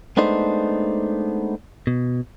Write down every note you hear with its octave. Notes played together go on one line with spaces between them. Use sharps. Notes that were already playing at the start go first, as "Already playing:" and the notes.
G#3 A3 B3 D4 D#4 C5
B2